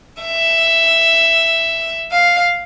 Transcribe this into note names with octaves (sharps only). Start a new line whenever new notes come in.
E5
F5